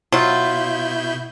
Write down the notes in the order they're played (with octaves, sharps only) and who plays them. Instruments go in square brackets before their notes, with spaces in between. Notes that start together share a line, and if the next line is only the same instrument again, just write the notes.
[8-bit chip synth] B2 E4 G6 [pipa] F#3 F4